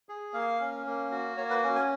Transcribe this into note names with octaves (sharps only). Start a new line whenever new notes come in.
G#4
A#3 F5
C#4
A#3
F#4
A#3 C#5
B4
C#4
G#5